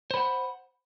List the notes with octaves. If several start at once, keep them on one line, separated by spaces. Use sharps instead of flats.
C5 F#5 B5